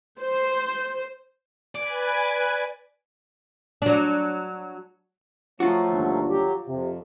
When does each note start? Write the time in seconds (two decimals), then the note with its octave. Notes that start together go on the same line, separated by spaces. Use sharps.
0.22 C5
1.75 B4 D5 G#5
3.82 F#3 D4
5.60 F3 F#3 A3 F4 F#4
5.91 G1 D#2 D3
6.29 F#3 G4
6.67 F2 C3